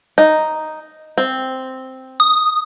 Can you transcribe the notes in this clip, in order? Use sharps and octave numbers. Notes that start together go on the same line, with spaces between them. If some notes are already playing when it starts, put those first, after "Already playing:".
D#4
C4
D#6